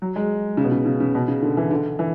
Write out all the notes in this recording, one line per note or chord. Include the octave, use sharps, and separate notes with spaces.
F#3
G#3
C#3
B2
C#3
C#3
C#3
B2
C#3
D3
E3
D3
E3